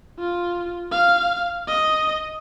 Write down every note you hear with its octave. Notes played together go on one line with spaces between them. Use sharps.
F4
F5
D#5